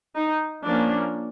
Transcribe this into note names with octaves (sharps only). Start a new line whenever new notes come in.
D#4
F3 A#3 C#4 D4